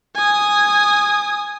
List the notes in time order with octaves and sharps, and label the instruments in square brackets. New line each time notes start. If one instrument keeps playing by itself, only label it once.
[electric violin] G#5 D#6